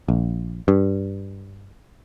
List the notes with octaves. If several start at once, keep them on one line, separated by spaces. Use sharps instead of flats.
A#1
G2